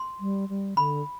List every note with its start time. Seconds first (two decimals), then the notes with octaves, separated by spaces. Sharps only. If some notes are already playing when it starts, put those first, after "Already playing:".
Already playing: C6
0.20 G3
0.49 G3
0.77 D3 B5